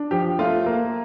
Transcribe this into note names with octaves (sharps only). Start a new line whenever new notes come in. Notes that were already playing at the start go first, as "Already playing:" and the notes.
Already playing: D4
F3 G4
A3 F4
A#3